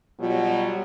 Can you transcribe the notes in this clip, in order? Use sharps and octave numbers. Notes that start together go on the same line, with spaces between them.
B2 F#3 G3 F4